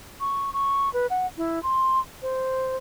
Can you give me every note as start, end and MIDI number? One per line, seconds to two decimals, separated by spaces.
0.20 0.53 85
0.53 0.92 85
0.93 1.07 71
1.10 1.27 78
1.37 1.62 64
1.63 1.99 84
2.22 2.77 72